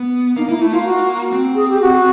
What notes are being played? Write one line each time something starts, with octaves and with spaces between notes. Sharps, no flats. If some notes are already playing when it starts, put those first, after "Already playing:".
Already playing: B3
A#3 D#4
A#3 E4
A3 E4
A#3 F4
F#4
C4
G#4
G4
F#4